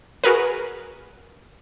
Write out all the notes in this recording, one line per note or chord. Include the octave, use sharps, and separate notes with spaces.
F#4 G#4 A#4 B4